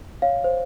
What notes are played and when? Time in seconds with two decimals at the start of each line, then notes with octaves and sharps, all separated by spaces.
0.22 C#5 F5
0.44 C5